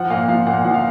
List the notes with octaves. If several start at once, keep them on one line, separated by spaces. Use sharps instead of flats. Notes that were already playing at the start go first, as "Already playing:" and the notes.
Already playing: F3 F#5
A#2 F5
F3 F5
A#2 F#5
F3 F#5
F5